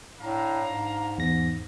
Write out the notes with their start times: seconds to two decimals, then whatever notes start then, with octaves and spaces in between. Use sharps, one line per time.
0.20 A2 D4 F5 A#5
0.66 G#2
1.18 E2 A#6